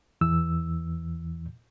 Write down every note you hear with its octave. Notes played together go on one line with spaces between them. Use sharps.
E2 E3 E6